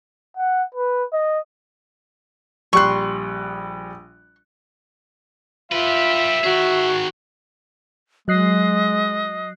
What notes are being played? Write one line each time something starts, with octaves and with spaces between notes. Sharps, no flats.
F#5
B4
D#5
A#1 G3 C6 C#6 F#6
F4 G4 B4 E5
D#3 F#4 G#4
F#3 G#3 D#5 F#6 C7